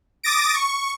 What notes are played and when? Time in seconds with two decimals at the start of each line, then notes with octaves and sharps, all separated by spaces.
0.23 D6 D#6 A6 A#6 D7
0.54 C#6